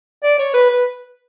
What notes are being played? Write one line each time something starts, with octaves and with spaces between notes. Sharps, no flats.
D5
C#5
B4
B4